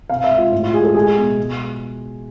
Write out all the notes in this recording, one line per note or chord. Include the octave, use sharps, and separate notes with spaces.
C3 F5
E5
G#3
F4
A2
F4
G#3 G#4
A4
G#3 G#4
B2
G#3